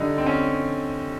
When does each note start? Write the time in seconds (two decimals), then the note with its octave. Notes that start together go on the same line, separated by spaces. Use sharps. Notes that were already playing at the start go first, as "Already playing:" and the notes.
Already playing: D3 G3 D#4
0.18 C4
0.26 C#4